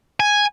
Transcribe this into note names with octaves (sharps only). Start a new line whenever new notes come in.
G#5